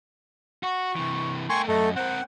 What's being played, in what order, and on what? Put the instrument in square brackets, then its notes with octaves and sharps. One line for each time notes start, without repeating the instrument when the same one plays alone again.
[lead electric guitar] F#4 [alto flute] C#6
[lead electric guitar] C3 E3
[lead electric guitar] A3 A#4 [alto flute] G5 [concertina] G#5 C6 C#6
[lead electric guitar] F#2 [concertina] A3 A4 [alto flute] D#5
[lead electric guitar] C4 A#4 [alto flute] C5 [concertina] F#5